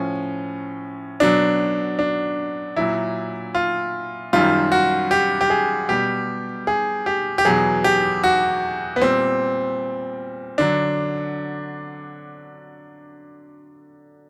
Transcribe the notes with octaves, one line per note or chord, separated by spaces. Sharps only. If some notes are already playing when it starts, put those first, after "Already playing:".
Already playing: A2 F3 C#4
B2 F#3 D4
D4
A#2 F#3 E4
F4
F#2 D#3 G3 F4
F#4
G4
G4
G#4
B2 G3 G4
G#4
G4
G4
E2 B2 F#3 G#4
G4
F#4
B3
A#2 G3 C4
D3 F#3 D4